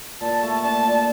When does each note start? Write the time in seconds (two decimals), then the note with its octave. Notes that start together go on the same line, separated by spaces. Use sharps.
0.21 A#2 A5
0.43 A3
0.64 D4 A5
0.85 A#2